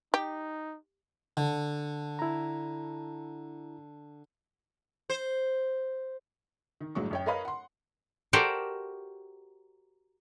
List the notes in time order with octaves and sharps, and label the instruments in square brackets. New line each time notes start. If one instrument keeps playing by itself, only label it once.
[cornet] D#4 [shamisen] G4
[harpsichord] D3
[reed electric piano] E4 A#5
[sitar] C5
[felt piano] D#3
G1 A2 F#3 G#3 C#6
F#2 C#5 G5
A#4 B4 C#5 D#5 F5 B5
F#5 C6
[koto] F#4 G4 A4 A#4 C5 D5